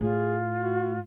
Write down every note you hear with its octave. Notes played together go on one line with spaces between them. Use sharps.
A2 F4 G#4
F#4